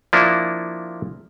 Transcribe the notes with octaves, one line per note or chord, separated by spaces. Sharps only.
F3 A#3 D4 E4